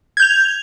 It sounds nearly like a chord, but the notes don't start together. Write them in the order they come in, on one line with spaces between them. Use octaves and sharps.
G#6 G6 F7